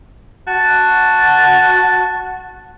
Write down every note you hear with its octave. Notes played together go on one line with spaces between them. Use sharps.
F#4 A5